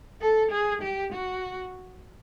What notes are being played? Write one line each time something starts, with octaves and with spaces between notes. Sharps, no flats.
A4
G#4
G4
F#4